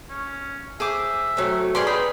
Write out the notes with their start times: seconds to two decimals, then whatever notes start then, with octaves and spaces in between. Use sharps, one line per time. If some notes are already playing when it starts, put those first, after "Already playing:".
0.10 C#4
0.80 G#4 C5 E5 D6
1.37 F#3 A3 C4
1.75 C#4 G#4 B4 D5 G5 C6
1.87 D#4 G#4 B5